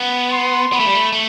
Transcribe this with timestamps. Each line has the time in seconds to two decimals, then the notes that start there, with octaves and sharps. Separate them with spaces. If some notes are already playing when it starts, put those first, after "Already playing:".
Already playing: B3
0.33 C6
0.72 B3 B5
0.80 A3
0.86 G3
0.94 A3
1.13 A3